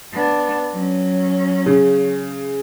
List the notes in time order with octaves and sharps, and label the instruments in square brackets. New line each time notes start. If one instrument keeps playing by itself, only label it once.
[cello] B3 D4
F#3 C#4
[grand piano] C#3